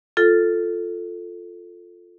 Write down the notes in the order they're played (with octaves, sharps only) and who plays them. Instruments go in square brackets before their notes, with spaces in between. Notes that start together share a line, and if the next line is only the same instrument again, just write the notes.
[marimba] F4 A4